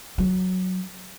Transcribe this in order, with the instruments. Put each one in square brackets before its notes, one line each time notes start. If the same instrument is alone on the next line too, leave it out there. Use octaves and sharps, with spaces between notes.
[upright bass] F#3